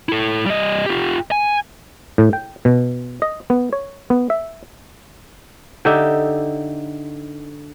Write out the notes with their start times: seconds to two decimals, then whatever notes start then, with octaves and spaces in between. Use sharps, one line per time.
0.09 E4 A4
0.46 G3 D#5
0.86 F4 G4
1.31 G#5
2.18 A2
2.33 G5
2.65 B2
3.22 D#5
3.50 B3
3.73 C#5
4.10 B3
4.30 E5
5.85 D3 D#4 G4 E5